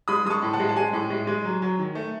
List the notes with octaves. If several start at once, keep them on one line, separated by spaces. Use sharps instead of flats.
G#3 B5 D#6
G#3 A5 C#6 D#6
A2
F#5 A5
G#3
A5
G#3 G#5
A2
G#3
G#3
F#3
F#3
D#3
A3